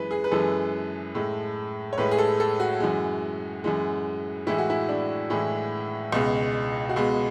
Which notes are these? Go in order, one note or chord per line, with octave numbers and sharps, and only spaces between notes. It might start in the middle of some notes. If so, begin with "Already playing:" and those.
Already playing: F#2 E3 G#3 B4
G#4
B4
F#2 E3 G#3 A4
A2 G#3
C#5
A2 G#3 B4
G#4
A4
A4
F#4
F#2 E3 G#3
F#2 E3 G#3
A2 E3 G#3 E4
F#4
E4
D4
A2 E3 G#3
C#2 B2 G#3
F#4
C#2 B2 G#3 G#4